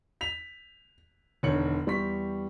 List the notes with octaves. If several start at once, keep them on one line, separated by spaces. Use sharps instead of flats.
B6 F7
E1 D3 D#3 C#5 C#7 F#7
E2 G3 C6 C#6 B6